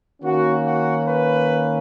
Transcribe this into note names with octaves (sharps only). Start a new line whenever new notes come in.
D#3 A#3 C#4 F#4
F#4
B4